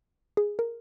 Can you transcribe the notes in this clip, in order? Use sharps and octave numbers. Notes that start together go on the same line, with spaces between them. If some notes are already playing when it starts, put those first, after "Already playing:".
G#4
A#4